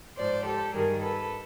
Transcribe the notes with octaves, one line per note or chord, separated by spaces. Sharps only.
G#2 F3 C5 D5
G4 A4
G2 D#3 G3 G#4 A#4
A4 B4